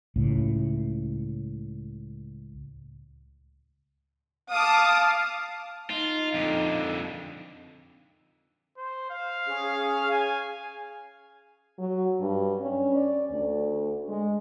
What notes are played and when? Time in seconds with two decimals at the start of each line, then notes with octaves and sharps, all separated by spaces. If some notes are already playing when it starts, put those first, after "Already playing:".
0.16 C#2 A2
4.50 F5 A5 D6 D#6
5.90 D#4 F4
6.34 F2 D3
8.78 C5
9.11 F5
9.47 C#4 G#4
10.11 G#5
11.79 F#3
12.20 G2
12.60 C#4
12.95 D5
13.31 D2
14.08 G#3